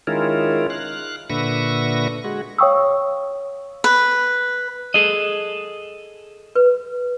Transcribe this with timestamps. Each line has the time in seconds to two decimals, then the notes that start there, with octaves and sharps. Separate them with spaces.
0.07 D#3 G#3 C#4 E4 F4 A#4
0.70 F5 F#6
1.30 A#2 D3 B4 E5 C#6 A#6
2.24 G#3 F#4
2.59 C#5 F5 G5 C#6 D#6 E6
3.84 B4
4.94 G#4 A4 D#5
6.55 B4